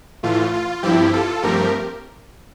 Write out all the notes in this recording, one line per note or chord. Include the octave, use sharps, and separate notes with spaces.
A2 E3 A3 F4
F4
G2 F3 C4 E4 G4
F4 A4
G2 F3 A3 C4 G4 A#4